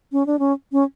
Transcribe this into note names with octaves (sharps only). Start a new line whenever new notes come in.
C#4
D4
C#4
C#4